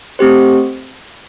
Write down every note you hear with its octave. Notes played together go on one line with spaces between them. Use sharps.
A3 C4 G4 C5